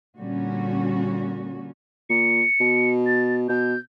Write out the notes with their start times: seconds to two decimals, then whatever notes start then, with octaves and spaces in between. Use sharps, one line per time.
0.18 A#2 D3 G3 C#4 F#4
2.10 A#2 C#7
2.60 B2
3.06 A6
3.49 B2 G6